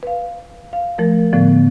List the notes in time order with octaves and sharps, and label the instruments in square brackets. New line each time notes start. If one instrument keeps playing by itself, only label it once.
[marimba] B4 F5
F5
F3 A3 A#4
A2 D3 F3 B3